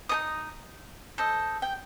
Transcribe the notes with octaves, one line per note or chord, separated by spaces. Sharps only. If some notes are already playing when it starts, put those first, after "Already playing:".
D#4 A4 D#5 D#6
A4 C5 D#5
G5